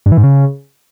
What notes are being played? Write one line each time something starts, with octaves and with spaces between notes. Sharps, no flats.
G2
E3
G#2
C#3